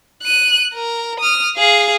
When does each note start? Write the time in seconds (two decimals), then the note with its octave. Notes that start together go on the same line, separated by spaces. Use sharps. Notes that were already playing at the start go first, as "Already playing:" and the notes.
0.24 F#6 D#7
0.74 A#4
1.20 D#6 F6
1.57 G#4 F5